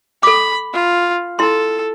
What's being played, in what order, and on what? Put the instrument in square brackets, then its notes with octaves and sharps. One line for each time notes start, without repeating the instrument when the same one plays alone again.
[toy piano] A4 D6 [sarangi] B5
[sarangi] F4
[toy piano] E4 C6 [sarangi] A4